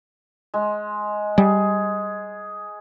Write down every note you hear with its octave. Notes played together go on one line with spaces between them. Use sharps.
G#3
G3 G#4